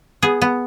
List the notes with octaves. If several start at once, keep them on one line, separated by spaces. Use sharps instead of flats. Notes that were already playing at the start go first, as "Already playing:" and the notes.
B3 G#4
B3